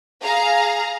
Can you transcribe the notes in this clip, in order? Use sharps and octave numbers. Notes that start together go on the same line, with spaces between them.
G#4 F5 A#5